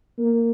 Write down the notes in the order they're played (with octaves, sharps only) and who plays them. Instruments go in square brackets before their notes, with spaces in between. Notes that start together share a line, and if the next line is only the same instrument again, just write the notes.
[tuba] A#3